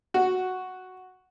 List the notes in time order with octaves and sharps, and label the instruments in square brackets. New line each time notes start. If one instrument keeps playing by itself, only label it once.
[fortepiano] F#4